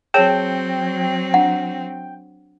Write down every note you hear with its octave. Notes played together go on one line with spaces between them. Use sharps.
F#3 C4 G#4 C#5 G5 A5
D4 F#5